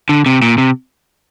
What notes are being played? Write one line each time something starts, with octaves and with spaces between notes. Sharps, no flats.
D3
C3
A#2
C3